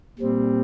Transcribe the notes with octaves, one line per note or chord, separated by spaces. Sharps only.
A#2 G3 C4